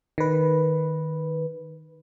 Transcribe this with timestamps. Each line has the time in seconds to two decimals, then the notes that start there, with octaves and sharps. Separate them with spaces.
0.18 D#3 B4